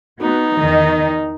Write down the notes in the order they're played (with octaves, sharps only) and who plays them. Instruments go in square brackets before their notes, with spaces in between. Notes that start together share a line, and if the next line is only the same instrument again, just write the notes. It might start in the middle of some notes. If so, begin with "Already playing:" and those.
[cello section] B3 F#4 [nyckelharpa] D#4
[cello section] E2 D#3 D#5